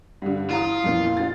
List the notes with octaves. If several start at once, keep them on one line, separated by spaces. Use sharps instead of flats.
G2 D3
E3 F4 A#5 D#6
F2 A#2 E3
F4 A6